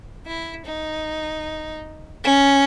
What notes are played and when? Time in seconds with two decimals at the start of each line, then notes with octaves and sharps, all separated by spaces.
0.26 E4
0.65 D#4
2.24 C#4